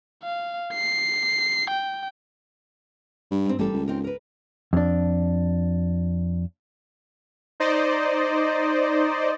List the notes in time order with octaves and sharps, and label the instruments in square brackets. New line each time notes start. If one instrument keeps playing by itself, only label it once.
[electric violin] F5
C7
G5
[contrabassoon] G2
[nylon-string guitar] G#2 C4
[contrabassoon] A1 [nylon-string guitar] G3 A#3 A4
[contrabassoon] C#2
[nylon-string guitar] C4 D#4 A#4
A#4 B4
[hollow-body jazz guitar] F2 D4
[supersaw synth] D#4 C5 D5 D#5